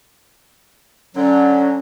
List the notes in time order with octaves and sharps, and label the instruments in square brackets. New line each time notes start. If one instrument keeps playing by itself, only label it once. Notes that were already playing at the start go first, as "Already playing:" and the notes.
[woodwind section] D3 F#3 [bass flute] C#4